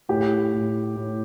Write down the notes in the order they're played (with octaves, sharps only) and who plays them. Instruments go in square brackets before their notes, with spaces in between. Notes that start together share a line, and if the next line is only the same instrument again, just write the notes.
[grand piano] A2 G4
A2
A2